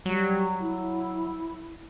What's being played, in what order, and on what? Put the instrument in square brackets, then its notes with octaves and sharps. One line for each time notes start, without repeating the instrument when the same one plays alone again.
[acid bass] F#3 [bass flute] G3
[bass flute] E4